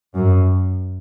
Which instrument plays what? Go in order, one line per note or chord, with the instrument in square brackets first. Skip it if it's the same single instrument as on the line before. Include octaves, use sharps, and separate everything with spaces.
[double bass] F#2